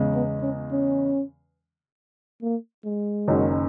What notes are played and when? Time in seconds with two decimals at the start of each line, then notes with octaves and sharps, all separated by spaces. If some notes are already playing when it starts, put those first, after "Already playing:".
Already playing: E2 C#3 G#3
0.14 B3
0.42 C#4
0.71 C#4
2.43 A#3
2.85 G#3
3.28 F#1 F#2 D#3 F#3 C#4